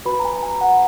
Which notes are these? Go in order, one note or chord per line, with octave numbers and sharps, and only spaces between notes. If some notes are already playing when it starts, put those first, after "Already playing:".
F#4 B4 B5
A#5
G#5
G#5
F#5